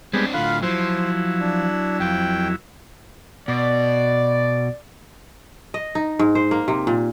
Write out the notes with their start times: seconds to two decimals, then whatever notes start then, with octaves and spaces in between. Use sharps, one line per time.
0.13 G3 G#3 B3 C4 D4
0.34 A2 D3 F4 F5 F#5 B5
0.63 F3 F#3 E4 C5
1.40 D4
2.00 F2 G5
3.48 B2 D5
5.74 D#5
5.95 D#4
6.19 G#2
6.35 C5
6.51 A#3
6.68 C3
6.87 A#2